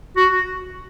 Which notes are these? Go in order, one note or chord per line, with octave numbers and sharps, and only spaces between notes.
F#4